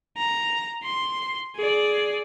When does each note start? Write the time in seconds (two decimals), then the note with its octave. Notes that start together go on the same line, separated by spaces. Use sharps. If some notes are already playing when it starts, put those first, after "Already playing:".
0.17 A#5
0.83 C6
1.56 G#4 D5